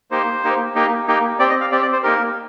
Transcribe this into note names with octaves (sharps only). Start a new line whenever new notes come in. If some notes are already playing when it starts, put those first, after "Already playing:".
A#3 D#4 G4 C5
A#3 D#4 G4
A#3 D#4 G4
A#3 D#4 G4
C4 G4 D5
D#5
F5
C4 G4 D5
D5
C5
A#3 D#4 G4 A#4